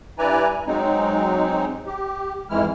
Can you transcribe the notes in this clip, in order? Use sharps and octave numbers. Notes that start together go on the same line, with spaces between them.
G2 E4 B4 D5 G#5 A#5
F#3 G#3 C4 D#4
G4
F2 G#2 E3 G#3 E4 F6